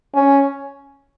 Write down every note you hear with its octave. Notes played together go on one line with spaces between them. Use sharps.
C#4